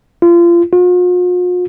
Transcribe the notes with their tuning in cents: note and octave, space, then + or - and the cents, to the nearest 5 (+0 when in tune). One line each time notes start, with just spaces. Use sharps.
F4 -30
F4 +45